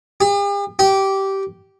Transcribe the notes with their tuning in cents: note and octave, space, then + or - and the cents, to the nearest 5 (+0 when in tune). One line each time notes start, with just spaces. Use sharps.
G4 +45
G4 -15